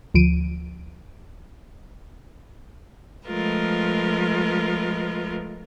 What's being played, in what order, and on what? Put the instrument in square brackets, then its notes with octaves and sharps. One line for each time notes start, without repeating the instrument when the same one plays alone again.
[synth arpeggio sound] D2 F3 D7 D#7
[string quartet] F3 G#3 A3 F4 A#4 B4